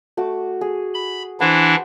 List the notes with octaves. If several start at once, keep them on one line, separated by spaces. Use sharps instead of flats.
A3 F#4 D6
G#4
B5
E3 D4 E4 C5 F#5